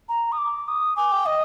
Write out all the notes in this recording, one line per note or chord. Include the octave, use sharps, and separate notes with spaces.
A#5
D#6
D6
D#6
G#5 D6
G5
D#5 D#6